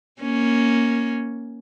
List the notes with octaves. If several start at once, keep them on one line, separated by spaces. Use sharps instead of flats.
A#3 C#4